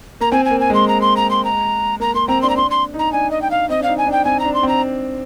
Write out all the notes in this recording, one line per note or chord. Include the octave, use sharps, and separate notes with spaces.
A#3 A#5
C4 G#5
G#5
A#3
G#5
G#3 C6
A#5
C6
A#5
C6
A#5
A#3 A#5
A#3 C6
C4 A#5
D4 C6
A#5
D4 C6
C6
D#4 A#5
D4 G#5
D#5
G5
F5
C4 D#5
D4
D#4 F5
G#5
D4
G5
C4 G#5
A#5
D4
C6
C4 A#5